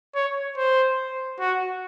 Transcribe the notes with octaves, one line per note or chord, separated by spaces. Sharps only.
C#5
C5
F#4